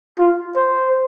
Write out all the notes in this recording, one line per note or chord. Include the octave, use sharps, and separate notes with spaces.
F4
C5